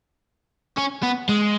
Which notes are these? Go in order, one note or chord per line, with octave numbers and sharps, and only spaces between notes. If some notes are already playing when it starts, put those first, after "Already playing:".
C#4
B3
G#3